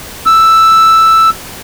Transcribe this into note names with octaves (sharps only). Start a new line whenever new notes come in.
E6